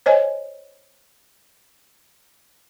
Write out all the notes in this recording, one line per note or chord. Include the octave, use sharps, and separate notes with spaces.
C5 C#5 D#5 G#5